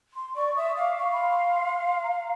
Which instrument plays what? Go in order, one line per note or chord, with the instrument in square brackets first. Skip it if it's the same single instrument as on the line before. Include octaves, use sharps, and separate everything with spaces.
[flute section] C6
[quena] D5 [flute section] C#6
[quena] E5 [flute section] D#6
[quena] F5 [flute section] D6
[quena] F5 [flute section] C#6
[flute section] B5
C6
A#5